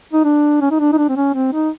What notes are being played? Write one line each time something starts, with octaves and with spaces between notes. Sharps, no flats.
D#4
D4
C#4
D#4
D4
D#4
D4
C4
C#4
C4
D#4